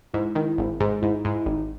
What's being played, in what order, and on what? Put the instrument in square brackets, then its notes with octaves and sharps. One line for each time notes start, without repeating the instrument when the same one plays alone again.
[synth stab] G#2 [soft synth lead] E4
[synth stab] D#3
G#1
G#2
[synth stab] G#2 [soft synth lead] E4
[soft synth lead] D#4
[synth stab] G#2 [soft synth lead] E4
[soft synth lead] E4
[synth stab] G#1 [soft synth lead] D#4